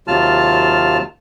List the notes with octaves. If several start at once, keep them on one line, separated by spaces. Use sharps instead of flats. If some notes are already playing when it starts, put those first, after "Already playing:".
D#2 C3 F#3 F4 A5 F6